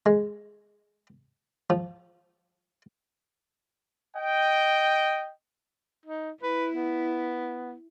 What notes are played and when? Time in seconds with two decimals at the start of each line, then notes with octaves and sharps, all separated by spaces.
0.06 G#3
1.70 F3
4.16 D#5 G5
6.06 D#4
6.43 E4 B4
6.73 B3